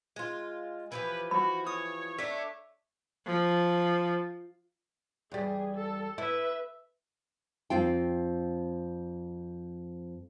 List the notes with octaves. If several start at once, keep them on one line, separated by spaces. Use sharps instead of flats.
G#3 F4
E3 F3 G4 B4
F#4 B5
C#5 D#6
A3 D4 E5
F3
E2 G3 G#4
A4
E4 B4 E5
F2 C4 F4 G5